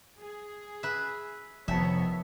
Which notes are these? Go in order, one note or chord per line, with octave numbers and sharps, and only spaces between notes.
G#4
B4 E5
F1 D#3 F3 B3 C#5 E5 A5